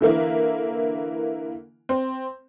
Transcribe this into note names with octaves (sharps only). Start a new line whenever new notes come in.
D3 E3 A#3 E4
C4